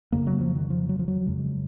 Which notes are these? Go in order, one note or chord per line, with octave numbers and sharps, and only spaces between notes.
F2 C#3 A#3
F#3
F3
D#3
F3
F#3
F3
F#3
F2 C#3 G#3